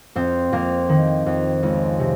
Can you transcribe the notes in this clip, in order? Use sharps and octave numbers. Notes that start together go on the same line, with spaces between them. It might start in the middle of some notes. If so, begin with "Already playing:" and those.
F2 C4
F2 A#3
D#3
F2
C#2
C3